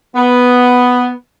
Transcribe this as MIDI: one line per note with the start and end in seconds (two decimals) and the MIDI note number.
0.16 1.11 59